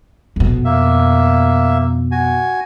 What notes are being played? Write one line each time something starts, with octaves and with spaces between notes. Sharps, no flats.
F2 B2
A#3 E5
F#4 G#5